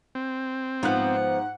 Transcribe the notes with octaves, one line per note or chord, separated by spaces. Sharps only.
C4
G#2 F3 B3 F4 F#5 F#6